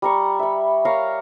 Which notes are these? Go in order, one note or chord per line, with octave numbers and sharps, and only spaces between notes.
G3 A#5 C#6
E5 B5
A#4 C#5 F5 A#5